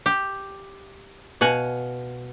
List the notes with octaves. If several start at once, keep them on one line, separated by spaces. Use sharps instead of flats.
G4
B2 F5 F#5 G#5